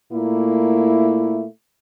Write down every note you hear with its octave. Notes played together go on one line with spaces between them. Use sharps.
A#2 A3 A#3 E4